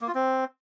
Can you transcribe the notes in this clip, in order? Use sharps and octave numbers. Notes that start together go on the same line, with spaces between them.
A#3
F4
C4